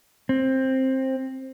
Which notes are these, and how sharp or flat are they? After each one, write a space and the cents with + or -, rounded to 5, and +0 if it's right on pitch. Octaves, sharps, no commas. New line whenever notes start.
C4 +15